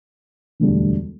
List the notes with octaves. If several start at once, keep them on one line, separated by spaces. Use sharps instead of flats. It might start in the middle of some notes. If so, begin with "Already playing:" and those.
E1 D2 D3 G3